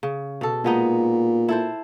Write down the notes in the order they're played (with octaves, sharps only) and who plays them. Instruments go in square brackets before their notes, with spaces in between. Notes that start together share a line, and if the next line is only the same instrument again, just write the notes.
[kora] C#3
B2 A4
[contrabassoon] A#2 [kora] G#3 B3 D#4
[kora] E4 A4 C5